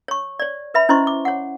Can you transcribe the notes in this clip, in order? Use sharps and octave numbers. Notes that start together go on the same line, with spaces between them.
C#5 C#6
C#5 D5
B4 E5 B5
C#4 E4 C5 D#5 C6 C#6
D6
C#5 F#5